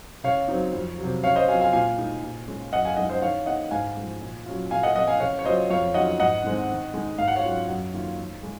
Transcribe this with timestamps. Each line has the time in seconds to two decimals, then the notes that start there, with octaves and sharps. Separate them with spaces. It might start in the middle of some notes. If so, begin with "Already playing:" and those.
0.24 C#3 C#5 F5
0.48 F#3 C4 D#4
0.73 F2
0.99 C3 F#3
1.23 C#3 C#5 F5
1.36 C5 D#5
1.48 F#3 C4 F4 F5 G#5
1.61 F5 G#5
1.73 A#2 F5 G#5
1.98 G#3 D#4
2.23 A#2
2.47 G#3 C#4 F4
2.72 F#2 D#5 F#5
2.85 F5 G#5
2.97 F3 G#3 D#4 D#5 F#5
3.10 C5 D#5
3.22 D#3 C#5 F5
3.46 A#3 D#4 D#5 F#5
3.71 G#2 F5 G#5
3.97 F3 G#3
4.22 A#2
4.46 F#3 C#4 F4
4.71 A#2 F5 G#5
4.83 D#5 F#5
4.95 F3 C4 D#5 F#5
5.07 F5 G#5
5.20 C#3 C#5 F5
5.39 C#5
5.45 F#3 C#4 F4 C5 D#5
5.70 F2 C#5 F5
5.94 D#3 F#3 C#4 F4 D#5 F#5
6.20 G#2 D#5 F#5
6.44 D#3 G#3 C4 D#4
6.70 D#3
6.94 G#3 D#4
7.18 G#2 F5
7.28 F#5
7.35 C#5 F5
7.43 F#3 C#4 F4
7.68 F#2
7.93 D#3 A#3 F4
8.18 D#3
8.43 G#3 D#4